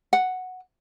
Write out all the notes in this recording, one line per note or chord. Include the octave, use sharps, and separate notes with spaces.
F#5